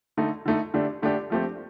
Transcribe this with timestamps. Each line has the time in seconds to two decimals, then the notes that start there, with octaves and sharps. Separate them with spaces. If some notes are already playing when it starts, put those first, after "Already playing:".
0.17 D3 A3 D#4
0.45 D3 A3 D#4
0.74 D3 A3 D4 G4
1.02 D3 A3 D4 G4
1.30 F3 A3 C4 G4